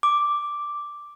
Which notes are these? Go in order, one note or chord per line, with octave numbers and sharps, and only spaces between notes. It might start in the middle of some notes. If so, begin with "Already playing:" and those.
D6